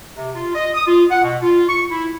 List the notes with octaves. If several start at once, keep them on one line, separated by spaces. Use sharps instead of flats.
C3
F4
D#5
D#6
F4
F#5
B2
F4
C#6
E4